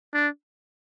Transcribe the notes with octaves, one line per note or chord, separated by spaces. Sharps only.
D4